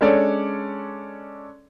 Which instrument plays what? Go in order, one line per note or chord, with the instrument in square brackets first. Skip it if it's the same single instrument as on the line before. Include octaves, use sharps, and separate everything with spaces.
[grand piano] G#3 C#4 D4 A4 C#5 D5